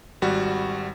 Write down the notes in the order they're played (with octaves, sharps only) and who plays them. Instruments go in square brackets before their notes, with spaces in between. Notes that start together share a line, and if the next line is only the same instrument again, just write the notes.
[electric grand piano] G#1 G3 F#4 F#5